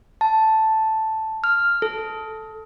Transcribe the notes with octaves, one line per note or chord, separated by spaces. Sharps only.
A5
F6
A4